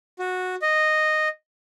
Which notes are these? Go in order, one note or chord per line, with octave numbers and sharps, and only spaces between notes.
F#4
D#5